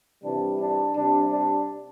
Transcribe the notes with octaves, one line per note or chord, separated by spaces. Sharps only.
C3 E3 G3 D4
D4
C3 G3 D4
D4